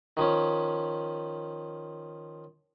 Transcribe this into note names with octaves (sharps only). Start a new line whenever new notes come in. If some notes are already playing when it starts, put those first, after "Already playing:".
D#3 F3 C#4